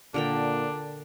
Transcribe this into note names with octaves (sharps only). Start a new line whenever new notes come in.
A#2 D3 D4 A#4 G5